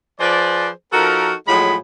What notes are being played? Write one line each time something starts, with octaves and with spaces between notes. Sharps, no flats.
F3 G#4 B4 C5 D5
F3 D#4 F#4 A4 A#4
A2 F3 F#3 G#3 G#4 B5